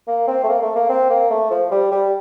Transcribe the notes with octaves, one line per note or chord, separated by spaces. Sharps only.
A#3
C4
A3
A#3
A3
A#3
C4
A#3
A3
F3
G3
G3